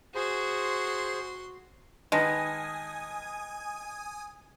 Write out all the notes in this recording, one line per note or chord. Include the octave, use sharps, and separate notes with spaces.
F#4 G#4 C5 C6
D#3 G#3 B4 D#5 G#5 A5 D#6 A#6